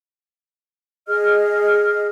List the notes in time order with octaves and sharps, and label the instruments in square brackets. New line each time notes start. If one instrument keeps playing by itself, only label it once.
[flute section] G#4 D#5 F6